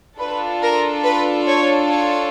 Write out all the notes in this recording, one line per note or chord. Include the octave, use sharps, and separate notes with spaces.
D4 F4 A4 B4
A#4
B4
C#5
C#5